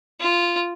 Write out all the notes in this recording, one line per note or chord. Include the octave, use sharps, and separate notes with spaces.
F4